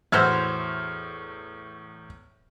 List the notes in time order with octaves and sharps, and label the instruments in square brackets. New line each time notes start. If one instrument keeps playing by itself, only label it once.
[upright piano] E2 A2 [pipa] E4 F#4 C5 [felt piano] E6 F6 G#6